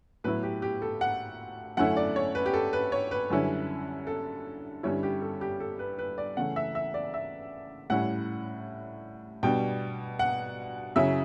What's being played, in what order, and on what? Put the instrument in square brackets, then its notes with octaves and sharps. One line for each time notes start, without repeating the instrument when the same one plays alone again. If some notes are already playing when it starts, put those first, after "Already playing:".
[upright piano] A2 F#3 B3 E4 B4
G4
G4
A4
F#5
F#2 D3 A3 C#4 E4 F#5
D5
C#5
B4
G4
A4
B4
C#5
B4
F#2 D3 G3 C#4 E4
A4
G2 D3 G3 C#4 E4 C#5
G4
A4
G4
A4
B4
B4
D5
C#3 E3 A3 C#4 F#5
E5
E5
D5
E5
A2 G3 C#4 E4 F#5
B2 G3 D4 G5
F#5
F#2 C#3 F#3 C#4 E4 E5